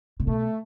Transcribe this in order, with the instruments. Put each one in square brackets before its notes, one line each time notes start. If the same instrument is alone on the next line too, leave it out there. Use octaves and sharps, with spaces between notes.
[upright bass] C3
[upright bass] B2 [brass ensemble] A3